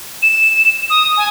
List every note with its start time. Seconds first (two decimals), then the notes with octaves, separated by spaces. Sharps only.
0.22 E7
0.90 D#6
1.17 G#5